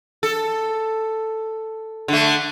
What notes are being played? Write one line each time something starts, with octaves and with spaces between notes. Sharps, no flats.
A4
D3 A3